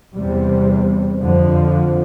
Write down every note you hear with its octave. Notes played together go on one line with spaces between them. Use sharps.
E2 C3 G3
F2 D3 F3